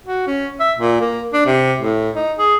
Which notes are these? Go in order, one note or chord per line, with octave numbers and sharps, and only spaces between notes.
F#4
C#4
E5
A#2
A#3
D4
C3
A2
D#4
G#4